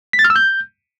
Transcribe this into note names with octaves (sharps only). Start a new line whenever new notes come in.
B6
A6
F6
E6
G6